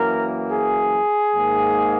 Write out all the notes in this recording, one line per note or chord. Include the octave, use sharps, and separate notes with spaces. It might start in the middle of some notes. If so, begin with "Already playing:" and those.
Already playing: F#2 E3 A#3 A#4
G#4
G#2 D#3 A#3